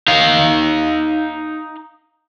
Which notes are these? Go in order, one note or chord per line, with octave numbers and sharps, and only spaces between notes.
D#4 F5